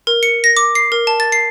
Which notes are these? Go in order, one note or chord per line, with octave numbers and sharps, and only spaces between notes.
A#4
C#7
A#6
D6
C7
A#4
A5
A6
C7